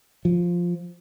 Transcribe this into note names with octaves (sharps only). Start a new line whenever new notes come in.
F3